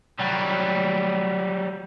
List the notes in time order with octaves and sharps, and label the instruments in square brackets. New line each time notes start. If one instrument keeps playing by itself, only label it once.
[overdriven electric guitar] F#3 G3